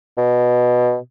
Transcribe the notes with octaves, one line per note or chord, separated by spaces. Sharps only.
B2